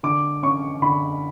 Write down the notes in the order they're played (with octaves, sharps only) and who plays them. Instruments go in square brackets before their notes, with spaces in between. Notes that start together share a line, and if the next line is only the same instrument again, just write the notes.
[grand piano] D3 D6
C#4 C#6
D3 B5